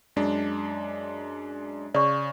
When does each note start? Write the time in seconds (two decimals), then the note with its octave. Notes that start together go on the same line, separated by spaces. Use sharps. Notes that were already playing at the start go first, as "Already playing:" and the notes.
0.16 F#2 G#3 D4
1.94 C#3 D5 C#6